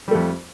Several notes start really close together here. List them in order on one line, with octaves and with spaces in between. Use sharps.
G3 A3 F2